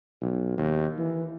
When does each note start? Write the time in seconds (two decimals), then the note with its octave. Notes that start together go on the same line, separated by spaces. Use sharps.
0.21 B1
0.57 D#2
0.98 E3